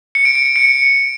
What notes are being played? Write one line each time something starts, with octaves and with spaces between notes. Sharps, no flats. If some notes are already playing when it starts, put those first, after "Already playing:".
C#7
D7
D7
D7
C#7